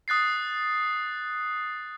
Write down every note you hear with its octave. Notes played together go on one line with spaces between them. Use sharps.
D#6 F#6 A6 C7